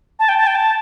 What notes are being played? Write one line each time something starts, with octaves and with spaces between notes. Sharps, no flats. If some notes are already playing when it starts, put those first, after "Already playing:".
A5
G5
A5
G5
A5